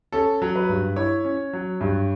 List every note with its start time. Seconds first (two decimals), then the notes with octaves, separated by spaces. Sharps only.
0.12 C#4 A4
0.42 F#3
0.56 B4
0.69 G2
0.96 E4 C#5
1.25 C#4
1.53 F#3
1.81 G2